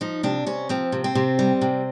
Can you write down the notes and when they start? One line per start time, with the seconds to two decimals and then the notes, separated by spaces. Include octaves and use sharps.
0.01 F3 D#4
0.23 C3 D4
0.46 C3 C#4
0.69 F3 C4
0.92 C3
1.04 C4
1.15 C3
1.39 G3
1.61 C3